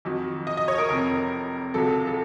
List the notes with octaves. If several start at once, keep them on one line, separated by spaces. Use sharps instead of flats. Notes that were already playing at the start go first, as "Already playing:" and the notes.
F2 D#3 F#3
D#5
D#5
C#5
A#4
F1 F2 C3 A#4
C#2 C3 F#3 A4
A4